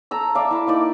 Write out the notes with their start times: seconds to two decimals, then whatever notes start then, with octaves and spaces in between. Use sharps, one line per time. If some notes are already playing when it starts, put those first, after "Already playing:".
0.11 A4 A#5 E6
0.35 D5 E5 F5
0.51 E4 A5
0.67 A#3 D#4 D5